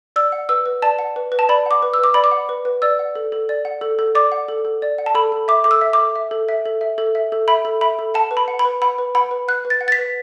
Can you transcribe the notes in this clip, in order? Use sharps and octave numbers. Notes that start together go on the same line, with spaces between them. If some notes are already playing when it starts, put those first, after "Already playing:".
D5 E6
F#5
B4 E6
B4
D5 A5
F#5
B4
B4
A5
D5 B5
F#5 D6
B4
E6
B4 D6
D5 B5
D6
F#5
B4
B4
D5 E6
F#5
A4
A4
D5
F#5
A4
A4
D5 D6
F#5
A4
A4
D5
F#5
A5
A4 B5
A4
E5 D6
A4 D6
E6
E5
A4 D6
E5
A4
E5
A4
E5
A4
E5
A4
E5 B5
A4
E5 B5
A4
F#5 A5
B4
B5
F#5
B5
B4
F#5 B5
B4
F#5 B5
B4
F#5 F#6
B4
A6
F#5
A6
B6
B4